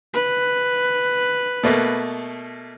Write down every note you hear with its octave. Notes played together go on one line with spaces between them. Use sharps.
B4
B2 A3 A#3